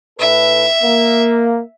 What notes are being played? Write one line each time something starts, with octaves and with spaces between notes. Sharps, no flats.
A2 A4 B4 E5
A#3